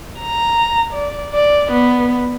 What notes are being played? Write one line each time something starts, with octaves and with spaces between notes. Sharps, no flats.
A#5
D5
D5
B3